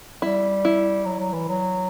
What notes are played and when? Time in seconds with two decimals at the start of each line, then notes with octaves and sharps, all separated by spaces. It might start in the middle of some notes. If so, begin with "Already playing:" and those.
0.22 G3 E4
0.65 E4
1.05 F#3
1.20 F#3
1.33 E3
1.48 F#3